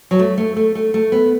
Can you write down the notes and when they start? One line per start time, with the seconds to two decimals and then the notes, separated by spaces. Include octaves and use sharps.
0.11 F#3
0.19 A3
0.38 A3
0.56 A3
0.75 A3
0.94 A3
1.12 B3